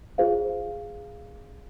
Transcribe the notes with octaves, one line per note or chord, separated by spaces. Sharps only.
F4 G#4 C5 F5